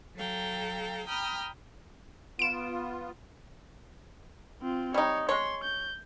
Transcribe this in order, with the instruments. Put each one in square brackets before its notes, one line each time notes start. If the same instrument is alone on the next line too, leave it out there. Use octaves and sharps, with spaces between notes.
[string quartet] F#3 A4 F5 G5 A#5
G5 A#5 B5 D#6 F6
[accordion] B3 F4 [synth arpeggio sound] D7 E7
[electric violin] C4 F4
[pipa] G3 D#4 [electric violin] C#5
[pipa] G#3 C#5 [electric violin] C6
[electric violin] G6